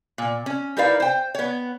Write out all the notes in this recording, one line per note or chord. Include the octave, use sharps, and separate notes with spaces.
A#2
C#4
D#4 E4 A#4 B4 D5 F5
C5 G5
B3 C#5